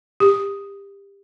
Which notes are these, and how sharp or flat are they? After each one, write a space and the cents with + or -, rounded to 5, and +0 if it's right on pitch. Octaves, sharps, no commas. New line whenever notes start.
G4 +25